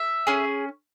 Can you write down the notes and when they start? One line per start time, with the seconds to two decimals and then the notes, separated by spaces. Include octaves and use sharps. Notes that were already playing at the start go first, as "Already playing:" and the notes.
Already playing: E5
0.27 C#4 G#4